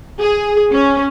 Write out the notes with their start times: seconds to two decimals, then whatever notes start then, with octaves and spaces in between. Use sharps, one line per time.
0.20 G#4
0.72 C#4